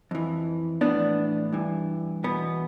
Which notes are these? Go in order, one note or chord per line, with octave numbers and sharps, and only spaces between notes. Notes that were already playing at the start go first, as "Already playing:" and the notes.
F2 E3
A2 E3 B3 D4
G2 E3
E2 B2 B3